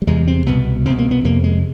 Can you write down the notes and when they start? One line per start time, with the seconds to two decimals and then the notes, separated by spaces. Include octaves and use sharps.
0.02 G3
0.07 E2 C3 G#3
0.27 C4
0.46 C2 B2 B3
0.85 C2 C4
0.90 B2
0.98 A#3
1.11 B3
1.24 F2 C3 A#3
1.44 G#3